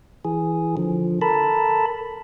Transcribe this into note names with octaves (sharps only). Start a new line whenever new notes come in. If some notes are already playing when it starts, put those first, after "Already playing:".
E3 G#4
D3 F3
A4 A#4 A5 B5